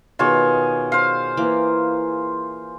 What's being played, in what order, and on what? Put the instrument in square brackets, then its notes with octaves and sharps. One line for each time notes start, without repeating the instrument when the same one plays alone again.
[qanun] B2 D#3 A5 [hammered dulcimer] F4 G#4 C#5
[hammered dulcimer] C5 F5
[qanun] E3 A#3 D6